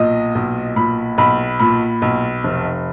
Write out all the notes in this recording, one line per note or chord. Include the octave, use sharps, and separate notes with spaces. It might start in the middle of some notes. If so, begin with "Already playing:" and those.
Already playing: B1 A#2 D#5
B1
A#2 B5
B1 B5
A#2 B5
B1
F1